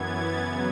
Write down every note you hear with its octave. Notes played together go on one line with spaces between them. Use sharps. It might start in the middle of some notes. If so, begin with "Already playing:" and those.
Already playing: F#2 E3 B3 G#6 A6
F#2 C#3 F#3 B3 G#6